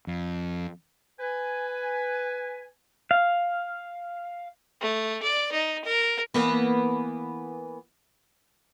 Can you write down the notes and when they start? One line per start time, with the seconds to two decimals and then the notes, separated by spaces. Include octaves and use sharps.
0.07 F2
1.20 B4 G#5
3.11 F5
4.81 A3
5.22 D5
5.52 D#4
5.85 A#4
6.34 E3 A#3 B3